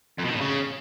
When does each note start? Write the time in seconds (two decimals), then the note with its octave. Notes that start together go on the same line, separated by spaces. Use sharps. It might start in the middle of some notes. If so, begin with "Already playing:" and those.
0.19 F2
0.25 B2
0.30 D#3
0.35 A2
0.41 C#3